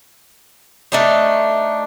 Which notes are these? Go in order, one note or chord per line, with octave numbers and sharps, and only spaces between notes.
A3 D4 D#4